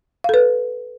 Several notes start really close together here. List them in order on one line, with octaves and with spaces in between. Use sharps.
F5 A4 B4